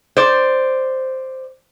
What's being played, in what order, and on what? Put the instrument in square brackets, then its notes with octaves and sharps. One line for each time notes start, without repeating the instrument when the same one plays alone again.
[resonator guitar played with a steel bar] C5 D5